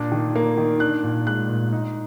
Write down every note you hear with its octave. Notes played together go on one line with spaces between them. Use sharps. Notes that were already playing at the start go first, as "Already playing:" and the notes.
Already playing: A#2 D4
D#3
A#3
D#3
D4 F#6
A#2
G#3 F#6
A#2
D#4